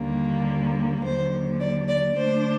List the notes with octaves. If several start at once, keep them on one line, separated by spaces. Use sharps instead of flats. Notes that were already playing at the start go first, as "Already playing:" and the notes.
Already playing: D#2 D3 G3 A#3
D#2 D3 F#3 C5
D5
D5
D3 A3 D4 C5